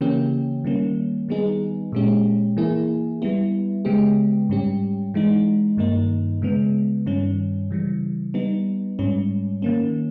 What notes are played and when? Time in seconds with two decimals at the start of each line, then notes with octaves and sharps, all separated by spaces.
0.01 C#3 E3 A#3 C#4 G4
0.64 D#3 G3 A#3 C#4
1.29 D#3 G3 B3 D#4 G#4
1.92 A#2 G#3 C#4 G4
2.57 E3 A#3 E4 G#4
3.22 G3 B3 E4
3.85 C#3 G#3 B3 G4
4.49 G#2 G3 C#4 G4
5.14 E3 G#3 D#4
5.77 G2 D#3 A#3 D#4
6.42 C#3 G#3 B3
7.06 G2 D#3 G3 C#4
7.70 C#3 E3 G3
8.34 G3 B3 D#4
8.99 G#2 G3 C#4
9.62 D#3 A#3 C#4